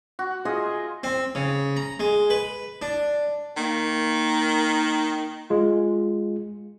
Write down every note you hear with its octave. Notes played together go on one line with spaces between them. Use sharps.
F#4
F4 G#4 D#5 E5
C4
C#3
A#5
G#3
B4
D4
D#3 A#3
G#3 F4